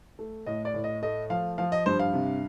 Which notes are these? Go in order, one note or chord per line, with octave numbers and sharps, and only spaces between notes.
A3
A2 D#5
D5
A2
D#5
A3 D#5
F3 F5
F3 F5
D#5
G2 C5
F5
C3